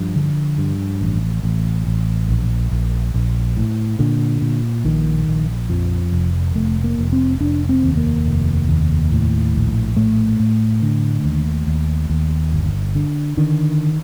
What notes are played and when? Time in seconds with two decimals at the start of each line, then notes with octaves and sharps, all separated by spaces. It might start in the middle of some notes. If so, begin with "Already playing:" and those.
Already playing: G2 F3
0.16 D3
0.58 G2
1.01 A1
1.43 A1
1.87 A1
2.29 A#1
2.71 A#1
3.14 A#1
3.57 A2
3.99 A#2 D3
4.42 A#2
4.84 A#1 D#3
5.28 A#1
5.69 F2 F3
6.12 F1
6.55 F1 A3
6.84 A#3
6.98 F1
7.12 C4
7.40 F1 D4
7.69 C4
7.83 D#2
7.97 A#3
8.26 F1
8.69 D#2
9.11 A2
9.54 A#1
9.96 A2 A3
10.40 A2
10.82 D3
11.25 D#2
11.67 D#2
12.10 D#2
12.52 G1
12.95 D3
13.37 D3 D#3